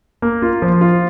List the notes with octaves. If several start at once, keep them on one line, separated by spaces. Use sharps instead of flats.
A#3
F4
F3
F4